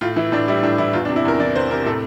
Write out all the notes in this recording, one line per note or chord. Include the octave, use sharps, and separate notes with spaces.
A2 F4
E3 E4
A2 D4
G3 E4
A2 D4
E3 E4
E2 F4
D4
C3
E4
E2 A#4
E3 D5
E2 C5
C3 A#4
A2 A4